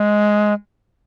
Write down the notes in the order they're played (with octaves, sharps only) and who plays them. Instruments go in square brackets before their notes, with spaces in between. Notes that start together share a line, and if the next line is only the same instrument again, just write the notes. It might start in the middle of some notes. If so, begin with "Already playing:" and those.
Already playing: [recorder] G#3